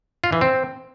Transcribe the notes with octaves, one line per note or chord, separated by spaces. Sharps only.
F4
E3
C4